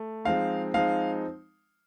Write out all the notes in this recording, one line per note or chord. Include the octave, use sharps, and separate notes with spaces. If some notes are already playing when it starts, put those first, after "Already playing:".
Already playing: A3
F3 G#3 C4 D#4 F5
F3 G#3 C4 D#4 F5